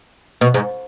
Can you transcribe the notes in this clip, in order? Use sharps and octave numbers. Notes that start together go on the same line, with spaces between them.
B2
G#2